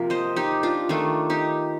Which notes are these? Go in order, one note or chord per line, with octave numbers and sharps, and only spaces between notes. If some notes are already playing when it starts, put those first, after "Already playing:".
Already playing: C3 F3 A#3 A#4
C5 D#5
D#4 G4
D4 F4
D#3 A3 D4 F4
D#4 G4